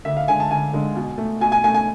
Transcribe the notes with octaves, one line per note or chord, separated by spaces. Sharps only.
D2 E5
F5
D3 G#3 G#5
A5
D2 G#5
D3 G#3
B2
A3
B2 G#5
G#5
A3 G#5
G#5